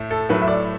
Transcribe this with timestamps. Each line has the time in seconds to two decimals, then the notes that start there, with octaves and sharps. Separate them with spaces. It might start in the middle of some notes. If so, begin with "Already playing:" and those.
Already playing: A2 A3
0.11 A4
0.29 A2 F#3 A3 B4
0.42 E5
0.48 D5